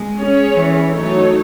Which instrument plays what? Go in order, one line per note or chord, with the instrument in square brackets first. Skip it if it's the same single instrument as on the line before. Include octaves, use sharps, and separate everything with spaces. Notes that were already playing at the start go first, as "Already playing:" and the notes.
Already playing: [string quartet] G#3
[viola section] C#4 G#4 C#5
[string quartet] E3
[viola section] F#3 A3 D#4 A4 C#5